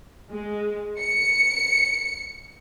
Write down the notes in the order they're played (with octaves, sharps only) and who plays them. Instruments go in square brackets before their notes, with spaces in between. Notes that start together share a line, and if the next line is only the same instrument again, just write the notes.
[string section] G#3
C#7